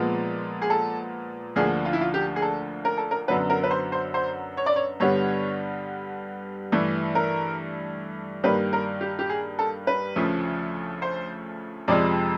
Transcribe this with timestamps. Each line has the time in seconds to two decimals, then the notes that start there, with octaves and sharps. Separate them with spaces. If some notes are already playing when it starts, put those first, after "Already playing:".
Already playing: A#2 F3 G#3 B3
0.62 G#4
0.70 A4
1.56 D2 D3 F3 A#3 G#4
1.85 F4
1.93 E4
2.01 F4
2.14 G4
2.36 G#4
2.42 A4
2.85 A#4
2.97 A4
3.11 A#4
3.28 F#2 D3 F#3 B3 B4
3.50 A#4
3.63 B4
3.71 C5
3.92 C5
4.14 C5
4.57 C#5
4.66 D5
4.76 C#5
5.00 G2 D3 G3 B3 C#5
6.72 G2 E3 A3
7.15 A#4
8.43 G2 D#3 G3 A#3 B4
8.73 A#4
9.01 G4
9.19 G4
9.29 G#4
9.59 A4
9.87 B4
10.16 D2 C#3 F3 A3
11.02 C5
11.88 F2 C3 F3 G#3 D5